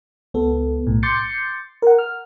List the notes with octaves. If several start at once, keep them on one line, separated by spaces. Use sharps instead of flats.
C#2 B3 A4
B1 A2
C6 D6 G6 A6 C7 C#7
A#4 F#5
F6